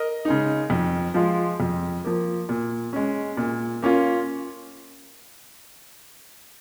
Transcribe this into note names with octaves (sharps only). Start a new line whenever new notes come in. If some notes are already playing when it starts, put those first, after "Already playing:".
Already playing: A#4 D#5
C#3 G#3 D#4
F2
F3 G#3 F4
F2
F3 A#3
A#2
G#3 C#4
A#2
A#3 C#4 F4